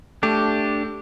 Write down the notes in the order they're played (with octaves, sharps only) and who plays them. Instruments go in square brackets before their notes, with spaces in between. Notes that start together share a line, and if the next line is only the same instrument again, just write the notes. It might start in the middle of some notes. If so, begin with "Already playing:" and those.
[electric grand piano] A3 [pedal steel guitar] D4 G4